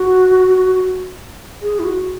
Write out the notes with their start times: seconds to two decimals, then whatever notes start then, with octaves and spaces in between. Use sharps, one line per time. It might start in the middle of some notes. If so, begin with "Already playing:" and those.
Already playing: F#4
1.62 G#4
1.79 E4
1.85 F#4